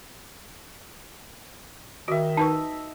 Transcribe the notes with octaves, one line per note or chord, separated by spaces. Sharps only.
D#3 F#4 D#5 E5
D#4 B4 A5 C#6